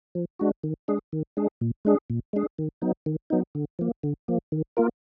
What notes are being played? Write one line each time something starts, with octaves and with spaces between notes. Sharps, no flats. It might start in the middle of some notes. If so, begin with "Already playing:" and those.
F3
G#3 D4 F#4
D#3
G#3 D4 G#4
D#3
G#3 D4 G#4
A#2
G#3 D4 G#4
A#2
G#3 D4 G#4
D#3
F#3 B3 D#4
D#3
F#3 B3 D#4
D3
F3 A#3
D3
F3 A#3
D#3
A#3 F4 A#4